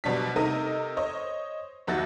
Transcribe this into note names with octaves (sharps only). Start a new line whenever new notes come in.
F#1 B2 G3 D4 B6
C3 A3 D#4 A#4 D#5 D#7
C5 C#5 D#5
F#1 D#2 F#4 E5 A6 A#6